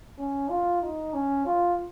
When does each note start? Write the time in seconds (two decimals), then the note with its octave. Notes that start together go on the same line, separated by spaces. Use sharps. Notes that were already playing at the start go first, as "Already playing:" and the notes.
0.18 C#4
0.49 F4
0.82 D#4
1.13 C#4
1.46 F4